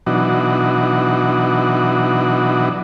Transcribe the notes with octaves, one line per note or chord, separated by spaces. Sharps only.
B2 E3 F#3 D4 D#4 F#4